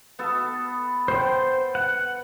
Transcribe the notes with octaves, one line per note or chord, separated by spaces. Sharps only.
B3 A4
C5 G5
F#5